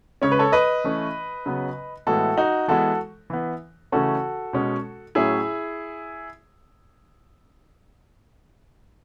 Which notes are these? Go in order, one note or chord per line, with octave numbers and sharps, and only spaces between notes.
C#3 G#3 C#4 C#5
B4
A4 C#5
B4 D#5
E3 A3 C#4
C#3 F#3 B3
A2 E3 G#3 B3 F#4 A4
D#4 F#4
E3 G#3 B3 F#4 A4
E3 B3
C#3 E3 A3 C#4 F#4 A4
B2 G#3 C#4
A2 F#3 C#4 E4 G#4